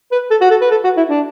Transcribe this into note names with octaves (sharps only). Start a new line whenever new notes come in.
B4
A4
F#4
A4
B4
A4
F#4
E4
D4